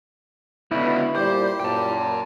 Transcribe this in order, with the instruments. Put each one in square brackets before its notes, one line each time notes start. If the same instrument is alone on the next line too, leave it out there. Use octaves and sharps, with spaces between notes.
[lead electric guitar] C#2 B2 [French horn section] D3 B3 [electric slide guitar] E4
[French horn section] A#2 G3 D5 [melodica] G4 [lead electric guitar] C5
[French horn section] F#2 A#2 [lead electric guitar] G5 A5